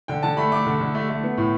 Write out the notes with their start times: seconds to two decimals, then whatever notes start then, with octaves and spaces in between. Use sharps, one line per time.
0.08 D3 G5
0.23 D3 A5
0.37 A3 B5
0.52 A3 D6
0.67 D3
0.81 D3
0.95 A3
1.09 A3
1.23 B3
1.38 A2